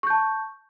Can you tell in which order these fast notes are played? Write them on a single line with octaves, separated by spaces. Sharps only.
C#6 G6 A5